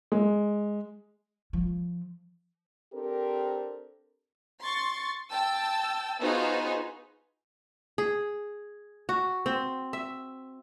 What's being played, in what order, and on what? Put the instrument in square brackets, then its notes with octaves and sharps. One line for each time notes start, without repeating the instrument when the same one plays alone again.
[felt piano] G#3
[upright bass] F3
[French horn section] C4 D4 G4 A4 A#4 C5
[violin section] C6 C#6 A6
G5 A5 E6
B3 D#4 F4 F#4 G#4 C5
[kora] G#4
F#4
C4
E5